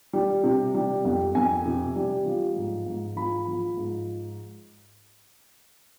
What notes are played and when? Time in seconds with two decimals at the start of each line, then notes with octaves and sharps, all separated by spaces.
0.13 G3
0.44 C3
0.74 G3
1.05 F2
1.35 F2 G#5
1.66 C3
1.96 G3
2.26 F3
2.56 G#2
2.86 G#2
3.16 F3 B5
3.47 F3
3.77 G#2